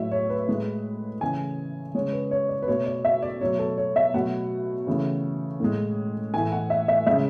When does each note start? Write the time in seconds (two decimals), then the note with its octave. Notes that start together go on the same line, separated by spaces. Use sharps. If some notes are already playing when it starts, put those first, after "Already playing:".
Already playing: A2 F#3 A3 E5
0.11 C#5
0.29 B4
0.48 A2 G#3
1.21 C#3 E3 A3 G#5
1.95 C#3 G#3 C#5
2.12 B4
2.31 C#5
2.49 D5
2.62 B4
2.68 B2 A3 C#5
2.86 D5
3.05 E5
3.23 D5
3.41 B2 F#3 A3 C#5
3.59 A4
3.78 C#5
3.96 E5
4.14 B2 F#3 A3 F#5
4.87 C#3 E3 A3
5.60 A2 G#3
6.34 A2 E3 A3 G#5
6.52 F#5
6.70 E5
6.88 E5
7.06 C#3 G#3 E5